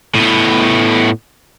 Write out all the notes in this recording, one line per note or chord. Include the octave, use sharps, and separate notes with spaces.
A2 B3